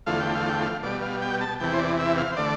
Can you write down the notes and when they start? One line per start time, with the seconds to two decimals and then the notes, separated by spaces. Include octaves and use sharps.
0.06 E2 D3 F3 A3 F5
0.20 G5
0.35 F5
0.49 G5
0.62 F5
0.83 B2 G3 D5
1.02 F5
1.22 G5
1.41 A5
1.60 E2 C3 E3 G5
1.74 C5
1.79 D5
1.99 E5
2.18 F5
2.32 C5
2.37 D3 A3 D5